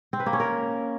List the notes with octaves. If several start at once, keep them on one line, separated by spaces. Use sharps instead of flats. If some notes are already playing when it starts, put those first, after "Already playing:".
C4
B4
A#3
C#4
A#4